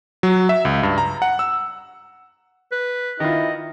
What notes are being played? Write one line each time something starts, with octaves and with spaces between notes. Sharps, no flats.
F#3
E5
C#2
G2
A#5
F#5
E6
B4
D#3 E4 F4 D#5